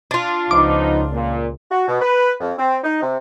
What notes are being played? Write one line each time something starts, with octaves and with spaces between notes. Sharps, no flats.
D4 F4
C#2 F3 B3 D#4 D6
A#2
F#4
B2
B4
F2
C4
D#4
C3